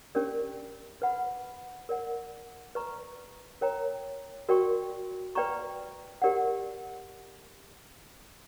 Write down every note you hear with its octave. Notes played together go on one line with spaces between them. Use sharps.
C#4 G4 A#4 D5
B4 F#5 B5
A#4 D5 F#5
B4 D5 A#5 C#6
A#4 C#5 G5 A#5
F#4 A#4 D5 G5 C#6
B4 D5 G5 A#5 C#6
G4 A#4 D5 F#5